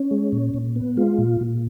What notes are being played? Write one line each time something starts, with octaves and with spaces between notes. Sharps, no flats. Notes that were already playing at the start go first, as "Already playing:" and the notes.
Already playing: C#4
G#3
A#2
A#2
B3
G#3 F4
A#2
A#2